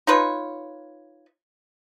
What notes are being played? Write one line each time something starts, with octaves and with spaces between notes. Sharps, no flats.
D#4 F4 B4 C#5